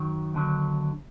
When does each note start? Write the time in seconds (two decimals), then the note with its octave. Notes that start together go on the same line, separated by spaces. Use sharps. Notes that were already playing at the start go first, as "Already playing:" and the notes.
Already playing: F#2 D#3 F#3
0.34 D#2 D3 F#3